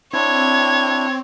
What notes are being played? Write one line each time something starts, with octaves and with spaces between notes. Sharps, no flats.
C4 D4 E4 C#5 G#6